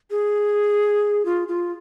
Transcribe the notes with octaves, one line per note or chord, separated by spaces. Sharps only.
G#4
F4
F4